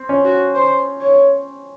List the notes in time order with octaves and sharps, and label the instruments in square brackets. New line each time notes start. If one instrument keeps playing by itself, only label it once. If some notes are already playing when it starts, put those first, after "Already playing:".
Already playing: [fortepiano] C4
C#4
[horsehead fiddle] F#4
C5
C#5